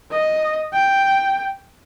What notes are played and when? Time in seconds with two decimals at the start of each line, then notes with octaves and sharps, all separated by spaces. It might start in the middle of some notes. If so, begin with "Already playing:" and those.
0.11 D#5
0.73 G5